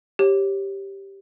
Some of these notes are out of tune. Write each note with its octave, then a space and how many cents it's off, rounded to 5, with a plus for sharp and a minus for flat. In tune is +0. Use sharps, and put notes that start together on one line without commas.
G4 +0 C#5 -20